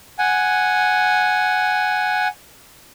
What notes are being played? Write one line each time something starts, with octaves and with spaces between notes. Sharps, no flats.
F#5 G#5